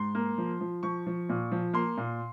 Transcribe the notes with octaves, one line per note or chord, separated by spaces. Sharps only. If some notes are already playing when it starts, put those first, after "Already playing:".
Already playing: G#2 C6
A#3
F3
F3
F3 C#6
F3
A#2
F3
A#3 C6
A#2